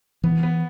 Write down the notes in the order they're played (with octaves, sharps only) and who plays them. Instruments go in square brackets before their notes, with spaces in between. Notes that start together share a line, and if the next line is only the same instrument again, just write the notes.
[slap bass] E3 [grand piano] B3
[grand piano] B3